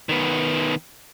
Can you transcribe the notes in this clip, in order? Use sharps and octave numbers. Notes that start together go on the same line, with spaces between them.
D#3 B3